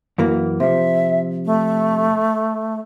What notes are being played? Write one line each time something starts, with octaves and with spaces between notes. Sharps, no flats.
F#2 E3 A#3
C3 F3 E5
A3